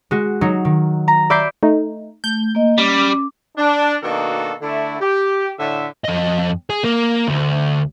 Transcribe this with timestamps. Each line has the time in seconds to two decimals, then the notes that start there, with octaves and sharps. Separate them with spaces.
0.11 G#3 F#4
0.41 F#3 D#4
0.65 D#3
1.08 A#5
1.30 D5 E5 B5 D6 G6 C7
1.63 A3 D#4
2.24 A3 G6
2.55 A#3 D#5
2.78 G3 C#4 D6
3.56 D4
4.03 B2 D#3 A#3 D4 F#4 A4
4.62 D3 A3 E4
5.00 G4
5.58 A2 D3 E5
6.04 F2 D#5
6.70 G#4
6.84 A#3
7.28 D2